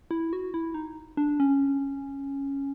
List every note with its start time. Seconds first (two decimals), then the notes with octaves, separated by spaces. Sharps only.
0.11 E4
0.33 F#4
0.54 E4
0.74 D#4
1.17 D4
1.40 C#4